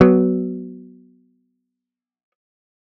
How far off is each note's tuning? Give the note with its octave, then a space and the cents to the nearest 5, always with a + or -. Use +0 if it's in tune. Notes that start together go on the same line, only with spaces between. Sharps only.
F#3 +10 B3 +0